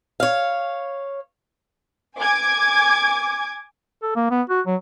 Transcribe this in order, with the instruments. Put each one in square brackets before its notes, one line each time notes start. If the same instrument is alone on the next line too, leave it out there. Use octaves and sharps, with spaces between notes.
[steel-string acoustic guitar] C#5 F5
[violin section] G#5 D6 G#6
[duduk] A4
A#3
B3
F#4
F#3